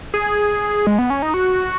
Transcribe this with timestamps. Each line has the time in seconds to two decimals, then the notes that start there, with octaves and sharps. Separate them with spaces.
0.14 G#4
0.87 G#3
0.98 B3
1.10 C#4
1.22 D#4
1.34 F#4